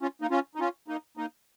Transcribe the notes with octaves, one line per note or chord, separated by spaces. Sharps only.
C#4 F4
A#3 D#4
C#4 F4
D#4
C#4 F4
A#3 D#4
A#3 D#4